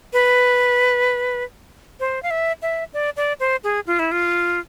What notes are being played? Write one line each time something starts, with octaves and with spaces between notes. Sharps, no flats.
B4
C5
F5
E5
E5
D5
D5
C5
G#4
F4
E4
F4